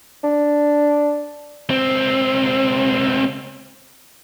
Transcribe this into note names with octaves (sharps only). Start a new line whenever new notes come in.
D4
C#2 C4